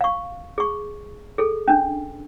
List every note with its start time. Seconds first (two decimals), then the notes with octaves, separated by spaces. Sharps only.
0.01 F5 C#6
0.58 G#4 C#6
1.38 G#4 A4
1.68 C#4 D4